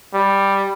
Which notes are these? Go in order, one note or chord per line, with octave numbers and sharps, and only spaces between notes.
G3